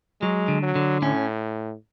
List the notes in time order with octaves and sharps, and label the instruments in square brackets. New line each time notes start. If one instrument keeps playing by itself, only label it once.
[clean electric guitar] F#3 [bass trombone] G#3
[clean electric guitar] D3
[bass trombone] F#3
[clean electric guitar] D3
[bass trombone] A2 [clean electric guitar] C#4